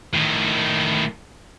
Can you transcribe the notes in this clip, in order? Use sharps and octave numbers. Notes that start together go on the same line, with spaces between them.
A2 D#3